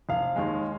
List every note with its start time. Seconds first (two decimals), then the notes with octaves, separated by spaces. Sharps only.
0.09 F1 F5
0.36 D#2 D#3 G#3